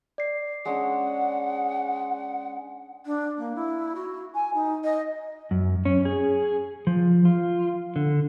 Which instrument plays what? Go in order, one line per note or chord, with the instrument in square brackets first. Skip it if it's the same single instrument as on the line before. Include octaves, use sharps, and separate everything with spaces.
[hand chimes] D5 C7
[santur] G#3 C#4 D4 [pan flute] F#5
[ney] D4
A#3
E4
F#4
G#5
D#4
D#5
[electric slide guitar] F#2
C#4
G#4
F3
F4
D3